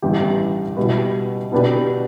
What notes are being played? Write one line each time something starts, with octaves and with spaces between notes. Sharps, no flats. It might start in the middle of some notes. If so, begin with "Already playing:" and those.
A1 G2 E3 B3 G4
B2 G3 E4 B4
B2 B3 D4 G4 B4